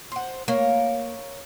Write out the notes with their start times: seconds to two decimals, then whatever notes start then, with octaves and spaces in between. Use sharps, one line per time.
0.12 C5 F#5
0.48 A#3 A#4 C#5